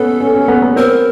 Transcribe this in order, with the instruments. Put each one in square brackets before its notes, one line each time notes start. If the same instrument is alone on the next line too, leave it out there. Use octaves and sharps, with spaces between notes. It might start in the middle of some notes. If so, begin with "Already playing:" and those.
Already playing: [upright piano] B3 C#4 [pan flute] A4
[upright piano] C#4
C#4
B3
B3
[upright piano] C4 [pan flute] A#4